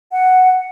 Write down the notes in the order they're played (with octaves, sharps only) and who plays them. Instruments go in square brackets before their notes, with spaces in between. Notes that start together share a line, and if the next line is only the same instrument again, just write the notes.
[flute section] F#5